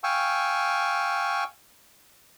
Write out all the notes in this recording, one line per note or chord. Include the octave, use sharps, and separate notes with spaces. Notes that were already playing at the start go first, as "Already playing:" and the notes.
F5 G5 G#5 C#6 E6